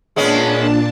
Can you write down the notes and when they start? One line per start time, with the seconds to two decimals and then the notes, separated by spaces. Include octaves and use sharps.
0.16 A#2 G#3 B3 C#4 D4 A5